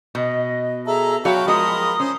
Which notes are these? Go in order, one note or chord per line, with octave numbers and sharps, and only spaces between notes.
B2 D#5
G#4 A4 E5 A#5
F#3 F#4 C#5 F5 G5 A5 B5
F3 G#3 A#4 D#5 D#6
C#4 C5